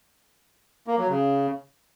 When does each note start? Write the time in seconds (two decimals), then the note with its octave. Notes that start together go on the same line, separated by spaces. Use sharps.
0.87 A#3
0.98 F#3
1.09 C#3